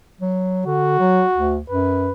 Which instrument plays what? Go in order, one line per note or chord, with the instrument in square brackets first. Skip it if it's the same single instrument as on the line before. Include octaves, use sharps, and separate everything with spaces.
[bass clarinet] F#3
[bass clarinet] D3 [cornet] F#4
[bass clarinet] F#3
D2
[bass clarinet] F#2 [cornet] B4